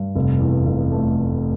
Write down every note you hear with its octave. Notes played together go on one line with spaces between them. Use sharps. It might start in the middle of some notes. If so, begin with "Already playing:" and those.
Already playing: G2
F1
E2
F1
A3